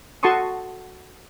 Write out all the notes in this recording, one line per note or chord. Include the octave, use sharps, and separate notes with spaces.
F#4 A4 A5 C6 C#6 D#6